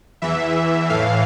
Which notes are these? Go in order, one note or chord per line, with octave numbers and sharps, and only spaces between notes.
E2 E3 E5
A2 E3 F5